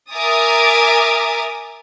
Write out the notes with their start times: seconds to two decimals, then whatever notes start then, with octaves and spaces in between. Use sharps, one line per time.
0.12 A#4 E5 G#5 D6 D#6 A6